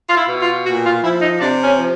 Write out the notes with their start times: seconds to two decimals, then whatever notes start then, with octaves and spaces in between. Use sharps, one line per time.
0.09 F4
0.17 E4
0.28 B2
0.41 F4
0.65 A#2 F#4
0.84 F4
1.02 F3 E4
1.21 D#4
1.39 C3 D4
1.63 C#4
1.76 F3